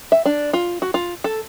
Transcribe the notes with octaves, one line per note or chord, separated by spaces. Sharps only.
E5
D4
F4
F#4
F4
A4